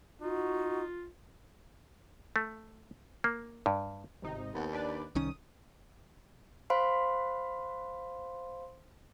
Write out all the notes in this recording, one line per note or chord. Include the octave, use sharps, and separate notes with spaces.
D#4 F4 F#4
A3
A#3
G2
G#1 C3 D#4
D#2 B3
D4 B4 D5
C2 D#3 C#4 D#6
C5 F5 B5 C6